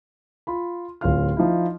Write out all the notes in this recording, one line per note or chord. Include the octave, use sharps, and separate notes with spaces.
F4 B5
D1 C#4 F4 F5 F6
F3 D#4 E4